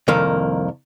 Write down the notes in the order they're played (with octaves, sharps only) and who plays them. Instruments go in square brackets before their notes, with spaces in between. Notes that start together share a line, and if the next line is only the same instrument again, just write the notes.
[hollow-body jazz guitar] C2 F2 D#3 A#3